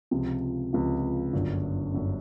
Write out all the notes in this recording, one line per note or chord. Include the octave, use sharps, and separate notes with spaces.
C#2 C3 F3
C#2 C3 F3
G1 F#2 D3
G1 F#2 D3